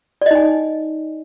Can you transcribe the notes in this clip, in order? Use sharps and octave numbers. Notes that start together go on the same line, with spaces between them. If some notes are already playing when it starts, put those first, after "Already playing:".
D#4 D5 D#5 G#5